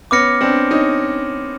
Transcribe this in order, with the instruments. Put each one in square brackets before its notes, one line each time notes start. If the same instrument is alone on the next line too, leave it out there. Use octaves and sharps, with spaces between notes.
[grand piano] B3 C#4 [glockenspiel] D6 F6 A#6 C#7
[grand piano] C4 D4
C#4 D#4